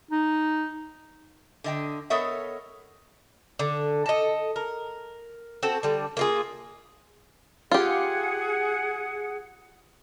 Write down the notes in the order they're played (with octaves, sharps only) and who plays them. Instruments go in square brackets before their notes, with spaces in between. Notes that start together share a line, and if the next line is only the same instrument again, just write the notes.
[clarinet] D#4
[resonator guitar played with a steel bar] D3 D#5 G5
B3 A4 A#4 C#5 D#5 E5
[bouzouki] D3
A4 D#5
A#4
C4 F#4 A4
D3 G3
A#3 F4 G#4
[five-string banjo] F4 G4 [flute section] G#4 F#5